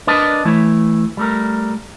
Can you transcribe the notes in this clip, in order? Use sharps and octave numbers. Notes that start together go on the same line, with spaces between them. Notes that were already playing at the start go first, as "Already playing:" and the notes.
D4 A#4 B4 D5 D#5 A5
E3 A3 E4 B4 C#5
G3 A3 A#4